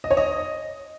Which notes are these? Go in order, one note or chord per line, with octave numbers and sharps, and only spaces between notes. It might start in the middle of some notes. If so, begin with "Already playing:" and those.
D#5
C#5
D#5